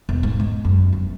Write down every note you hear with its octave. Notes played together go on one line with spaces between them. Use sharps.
E1
G#2
G#3
F#2
G1